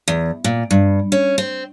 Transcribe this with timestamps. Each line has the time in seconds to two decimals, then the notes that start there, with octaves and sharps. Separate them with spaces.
0.08 E2
0.44 A#2
0.71 G2
1.12 C#4
1.38 C4